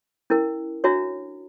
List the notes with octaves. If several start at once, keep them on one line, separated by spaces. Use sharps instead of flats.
C#4 E4 A#4
D4 F#4 C#5 E5 A#5